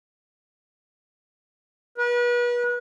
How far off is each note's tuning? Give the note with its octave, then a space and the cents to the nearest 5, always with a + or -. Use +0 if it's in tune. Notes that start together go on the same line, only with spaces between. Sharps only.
B4 -35